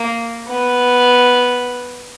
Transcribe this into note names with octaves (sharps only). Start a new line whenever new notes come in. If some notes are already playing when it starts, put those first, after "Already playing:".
Already playing: A#3
B3